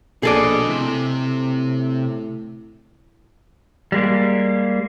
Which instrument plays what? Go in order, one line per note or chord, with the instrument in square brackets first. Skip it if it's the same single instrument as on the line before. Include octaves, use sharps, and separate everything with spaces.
[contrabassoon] A#1 [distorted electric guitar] B2 D#5 [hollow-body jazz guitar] G#4 A4 D5
[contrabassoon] A2 [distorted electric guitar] C3
[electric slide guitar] G3 G#3 A#3